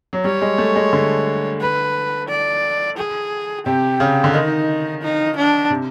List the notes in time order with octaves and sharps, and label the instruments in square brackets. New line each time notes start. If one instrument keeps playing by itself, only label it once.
[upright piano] F#3
[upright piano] G3 [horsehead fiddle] C#5
[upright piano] G#3
A3
G#3
D3
[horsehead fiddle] B4
D5
G#4
[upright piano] C3 [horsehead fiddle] G4
[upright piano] C#3
D3
[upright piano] D#3 [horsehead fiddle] D#4
[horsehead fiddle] D#4
D4
[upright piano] C3